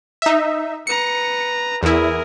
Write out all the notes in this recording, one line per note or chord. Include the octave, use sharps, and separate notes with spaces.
D#4 E5
B4 A#5 C#7
E2 E4 G#4 A#4